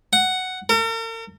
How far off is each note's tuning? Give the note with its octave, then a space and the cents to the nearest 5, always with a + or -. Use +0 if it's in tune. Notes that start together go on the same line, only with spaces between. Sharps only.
F#5 +5
A#4 -45